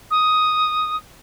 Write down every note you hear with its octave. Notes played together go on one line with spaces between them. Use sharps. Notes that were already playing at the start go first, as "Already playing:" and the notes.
D#6